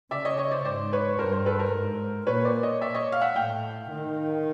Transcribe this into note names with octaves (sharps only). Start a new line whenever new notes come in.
C#3 D5 E5
C#5 D#5
C#5 D#5
C5 D5
G#2 C5 D5
B4 C#5
G2 A#4 C5
A#4 C5
A4 B4
A#4 C5
G#2
A#2 B4 C#5
C5 D5
C#5 D#5
D5 E5
C#5 D#5
F5
E5 F#5
A2 F5 G5
D#3